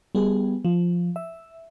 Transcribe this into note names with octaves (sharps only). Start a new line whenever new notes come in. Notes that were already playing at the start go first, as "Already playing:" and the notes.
G3 B3 G#4
F3
E5